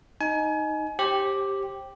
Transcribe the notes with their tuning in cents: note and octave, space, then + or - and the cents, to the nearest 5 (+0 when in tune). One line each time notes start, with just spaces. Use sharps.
D#4 +0 G#5 +30
G4 +0 C5 +35